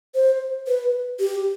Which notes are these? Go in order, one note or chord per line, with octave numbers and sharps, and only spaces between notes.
C5
B4
G4